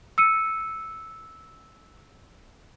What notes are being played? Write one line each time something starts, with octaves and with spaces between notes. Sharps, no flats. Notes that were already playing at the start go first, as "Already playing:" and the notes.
E6 C#7 D#7